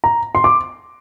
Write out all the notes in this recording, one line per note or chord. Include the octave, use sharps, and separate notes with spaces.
A#5
C6
D6